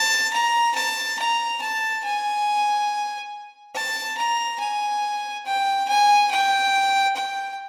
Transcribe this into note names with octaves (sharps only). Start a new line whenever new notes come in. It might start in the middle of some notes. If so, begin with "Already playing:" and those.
Already playing: A5
A#5
A5
A#5
A5
G#5
A5
A#5
G#5
G5
G#5
G5
G5